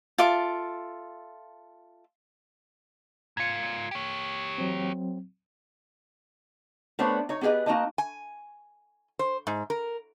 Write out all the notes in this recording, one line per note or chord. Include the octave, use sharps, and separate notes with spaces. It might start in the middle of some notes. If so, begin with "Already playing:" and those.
F4 A4 E5 D6
G#2 F4 G#6 C#7
G4 C#5
F#3 C4
A3 B3 D4 C5 C#5 F#5
D#4 C#5
B3 G4 G#4 B4 D#5
A#3 D#4 F#4 D#5 A5
G#5
C5
G#2
A#4